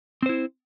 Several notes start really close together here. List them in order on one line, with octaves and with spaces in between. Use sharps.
C4 C5 E4